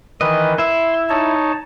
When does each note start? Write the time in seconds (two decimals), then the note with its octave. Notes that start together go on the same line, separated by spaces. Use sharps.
0.21 D#3 E3 B4 D#5
0.58 E4 E5 C6
1.10 D#4 C#5 A5